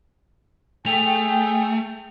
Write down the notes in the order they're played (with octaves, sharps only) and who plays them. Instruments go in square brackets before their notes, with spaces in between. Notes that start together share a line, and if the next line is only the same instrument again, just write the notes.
[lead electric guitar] A3 [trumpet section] G#4 G5 [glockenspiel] F7